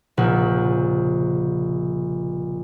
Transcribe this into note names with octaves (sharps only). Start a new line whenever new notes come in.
F1 A#1 C#3 F#5 A6